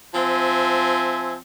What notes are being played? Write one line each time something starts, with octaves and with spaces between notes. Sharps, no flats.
F3 C4 E5 G#5